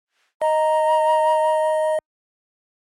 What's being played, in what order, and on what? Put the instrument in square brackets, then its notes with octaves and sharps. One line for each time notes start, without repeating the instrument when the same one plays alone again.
[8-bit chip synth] D#5 [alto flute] A#5